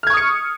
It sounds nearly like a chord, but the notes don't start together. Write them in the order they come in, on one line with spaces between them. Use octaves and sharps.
F6 G#6 C#6 D#6 C#7